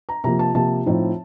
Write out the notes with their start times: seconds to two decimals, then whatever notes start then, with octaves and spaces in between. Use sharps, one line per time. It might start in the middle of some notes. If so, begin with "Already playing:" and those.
0.09 A#5
0.24 C3 F3 A#3 A#5
0.39 A5
0.55 C3 F3 A#3 A5
0.86 A2 F3 C4 D#4